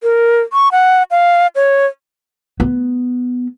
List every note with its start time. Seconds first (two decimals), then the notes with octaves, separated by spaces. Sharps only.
0.03 A#4
0.53 C#6
0.72 F#5
1.11 F5
1.56 C#5
2.60 B3